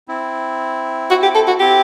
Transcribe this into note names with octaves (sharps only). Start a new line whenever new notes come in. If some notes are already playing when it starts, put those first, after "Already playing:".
C4 E4
F#4
G4
A4
F#4
C4 E4 G4